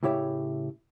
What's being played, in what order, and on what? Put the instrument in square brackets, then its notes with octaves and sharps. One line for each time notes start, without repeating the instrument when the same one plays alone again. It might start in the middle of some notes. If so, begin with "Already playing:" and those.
[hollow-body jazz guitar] A2 C#3 E4 G4 C#5 E5